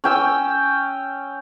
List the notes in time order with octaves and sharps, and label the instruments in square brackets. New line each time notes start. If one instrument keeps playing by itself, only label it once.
[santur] C#4 G5 E6